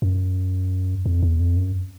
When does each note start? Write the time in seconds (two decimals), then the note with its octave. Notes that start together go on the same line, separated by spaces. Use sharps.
0.02 F#2
1.06 F2
1.23 E2
1.40 F2
1.57 F#2